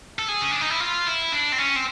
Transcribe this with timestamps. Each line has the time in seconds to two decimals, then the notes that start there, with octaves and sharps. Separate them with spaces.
0.19 A4
0.28 G#4
0.42 C#4
0.51 D4
0.61 D#4
0.70 E4
0.80 F4
1.07 E4
1.32 D4
1.52 C4
1.58 C#4
1.76 C4